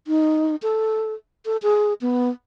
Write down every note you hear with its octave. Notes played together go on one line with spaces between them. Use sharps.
D#4
A4
A4
G#4
B3